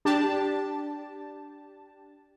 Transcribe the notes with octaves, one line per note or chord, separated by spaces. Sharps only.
D4 G4 A5